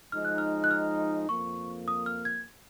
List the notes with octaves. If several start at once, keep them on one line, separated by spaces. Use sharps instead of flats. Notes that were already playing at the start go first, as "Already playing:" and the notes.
F3 G#3 D#4 F6
F#6
F6
F#6
F6
F2 F3 A#3 C#6
D#6
F6
G#6